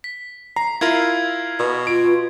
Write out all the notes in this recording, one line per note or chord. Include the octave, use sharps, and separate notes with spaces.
B6
A#5 C7
E4 F4 A#4 G#6
B2
F4 D7